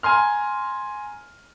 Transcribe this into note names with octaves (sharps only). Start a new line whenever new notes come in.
G#5 A#5 C6 F6